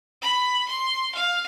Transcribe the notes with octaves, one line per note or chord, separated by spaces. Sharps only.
B5
C6
F5